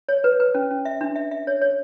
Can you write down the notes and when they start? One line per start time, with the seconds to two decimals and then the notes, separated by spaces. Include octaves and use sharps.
0.09 C#5
0.24 B4
0.40 B4
0.55 C#4
0.71 C#4
0.85 E5
1.01 D4
1.16 E5
1.31 E5
1.47 C#5
1.62 C#5